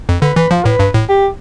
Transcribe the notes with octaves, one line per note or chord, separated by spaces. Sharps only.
F2
D3 B4
E3 B4
F3 F4
A2 B4
G2
A2
G4